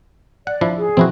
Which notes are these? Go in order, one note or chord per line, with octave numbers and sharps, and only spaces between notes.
D5 F#5
F3 D4 E4
G#4
B2 E3 F3 C4 E4 F#4